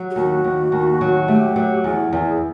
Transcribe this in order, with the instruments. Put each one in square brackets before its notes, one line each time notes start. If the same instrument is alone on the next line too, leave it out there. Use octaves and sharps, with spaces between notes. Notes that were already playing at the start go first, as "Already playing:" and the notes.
Already playing: [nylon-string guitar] F#3
[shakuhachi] G4
[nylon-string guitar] D#2 [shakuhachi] F#4
[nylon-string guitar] D#2
D#2
F#3
[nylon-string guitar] A3 [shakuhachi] G4
[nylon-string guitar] F#3
[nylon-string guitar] E2 [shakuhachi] G#4
[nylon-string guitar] E2